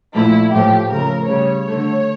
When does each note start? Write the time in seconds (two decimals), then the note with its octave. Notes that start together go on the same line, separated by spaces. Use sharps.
0.14 A#2 F3 A3 E4
0.52 A2 F3 A3 G4
0.90 C#3 F3 A3 A#4
1.28 C#3 G3 C#5
1.67 D3 A3